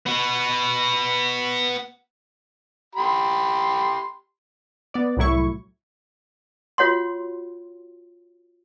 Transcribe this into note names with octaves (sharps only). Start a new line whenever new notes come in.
B3 F#4
G4 B5 C6
B3 D5
C2 A2 F#3 E4 C#6
F4 F#4 C#5 F#5 C6